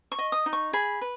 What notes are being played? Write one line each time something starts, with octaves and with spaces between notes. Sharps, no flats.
C#6
D#5
D#6
D#4
C#6
G#4 B5
B4